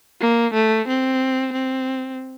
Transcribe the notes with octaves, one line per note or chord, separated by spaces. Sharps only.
A#3
A3
C4
C4